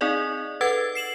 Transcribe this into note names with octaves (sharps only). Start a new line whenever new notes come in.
C4 D#4 G#4 D5 D#5
A4 B4 F#5 E6 G#6 A6
C7 E7 F#7